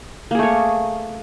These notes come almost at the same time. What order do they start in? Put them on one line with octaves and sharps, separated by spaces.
A#3 G#4 A3 C#5